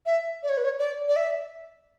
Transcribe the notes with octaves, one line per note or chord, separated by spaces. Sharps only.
E5
D5
C#5
B4
C#5
D5
D5
E5